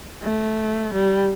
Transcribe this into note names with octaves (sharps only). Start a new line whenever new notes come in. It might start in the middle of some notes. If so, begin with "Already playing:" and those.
A3
G3